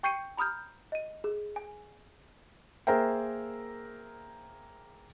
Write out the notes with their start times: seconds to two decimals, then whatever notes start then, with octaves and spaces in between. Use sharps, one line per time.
0.03 G5 C#6 G6 C7 C#7 D#7
0.37 A#5 B5 D#6 F6 G6
0.92 D#5 D#7
1.24 G#4
1.56 G#5
2.87 A#3 G#4 A#4 C5 E5 G5